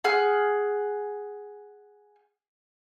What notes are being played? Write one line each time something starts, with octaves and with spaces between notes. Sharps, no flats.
G#4 F#5 F6